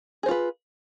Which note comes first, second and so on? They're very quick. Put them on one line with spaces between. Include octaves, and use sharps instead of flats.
G#4 C5 F4 B4